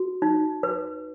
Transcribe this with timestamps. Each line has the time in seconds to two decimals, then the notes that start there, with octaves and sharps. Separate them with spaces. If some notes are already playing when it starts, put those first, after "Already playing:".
Already playing: F#4
0.22 D#4
0.63 B4